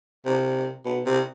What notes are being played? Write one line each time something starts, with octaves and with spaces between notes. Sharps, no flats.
C3
B2
C3